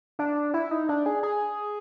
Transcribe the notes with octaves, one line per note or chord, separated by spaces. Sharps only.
D4
E4
D#4
D4
G#4
G#4